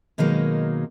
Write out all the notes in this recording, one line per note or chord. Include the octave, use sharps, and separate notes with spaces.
B2 D#3 F#3 G#3 A#3 D#4